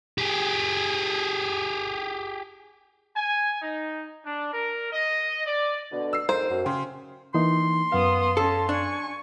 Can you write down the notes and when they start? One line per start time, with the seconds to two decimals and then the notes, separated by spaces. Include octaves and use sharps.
0.18 G4 G#4
3.16 G#5
3.62 D#4
4.24 D4
4.53 A#4
4.92 D#5
5.47 D5
5.92 B2 D3
6.13 E6 C7
6.29 F2 G#2 A#4 C5
6.50 F#2
6.66 C#3 G5 C6
7.34 E3 A#3 D#4 C6
7.92 F#2 B3 F5 D#6
8.37 C#4 A4 A5
8.69 D4 G#5 C#6